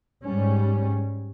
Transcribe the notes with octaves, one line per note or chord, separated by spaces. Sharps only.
G#2 G3 C#4